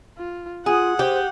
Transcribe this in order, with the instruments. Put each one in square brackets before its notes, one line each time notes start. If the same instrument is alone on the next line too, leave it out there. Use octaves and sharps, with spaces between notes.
[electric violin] F4
[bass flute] F4 [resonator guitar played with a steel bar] G#4 [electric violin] F#5
[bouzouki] G4 [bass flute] C5